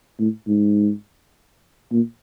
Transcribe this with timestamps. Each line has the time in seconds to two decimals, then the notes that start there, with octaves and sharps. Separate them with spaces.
0.20 A2
0.47 G#2
1.92 A#2